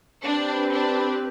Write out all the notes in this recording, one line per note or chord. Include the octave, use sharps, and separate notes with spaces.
C4 D4 G4 B4
D4